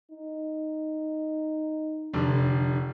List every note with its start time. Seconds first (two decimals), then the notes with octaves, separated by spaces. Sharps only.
0.11 D#4
2.13 F1 D3